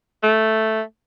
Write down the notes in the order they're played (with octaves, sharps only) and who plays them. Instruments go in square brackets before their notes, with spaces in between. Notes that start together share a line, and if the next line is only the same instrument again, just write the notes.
[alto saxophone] A3